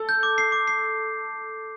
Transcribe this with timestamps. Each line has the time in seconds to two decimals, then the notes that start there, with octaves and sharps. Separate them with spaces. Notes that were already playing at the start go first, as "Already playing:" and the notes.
Already playing: A4
0.09 G6
0.23 D6
0.38 C7
0.52 D6
0.68 C7